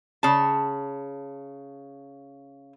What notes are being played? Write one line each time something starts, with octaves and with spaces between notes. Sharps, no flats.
C#3 A5